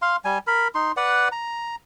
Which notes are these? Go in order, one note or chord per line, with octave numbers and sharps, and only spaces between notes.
F5 C6
G3 G#5
A#4 B5
D#4 C6
B4 D5 F#5
A#5